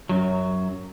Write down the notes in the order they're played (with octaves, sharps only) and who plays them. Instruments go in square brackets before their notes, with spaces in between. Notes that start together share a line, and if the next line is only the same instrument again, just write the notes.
[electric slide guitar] F#2 F#3